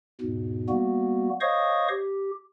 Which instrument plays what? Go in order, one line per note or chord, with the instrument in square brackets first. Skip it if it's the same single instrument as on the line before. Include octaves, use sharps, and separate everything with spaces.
[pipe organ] E2 G#2 B2
G3 A#3 B3 F#4
C5 C#5 D#5 F5 C#6 D#6
G4